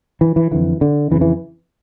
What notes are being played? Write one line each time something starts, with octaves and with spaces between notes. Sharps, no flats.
E3
E3
F2 D3 E3
D3
F2 C#3 E3
E3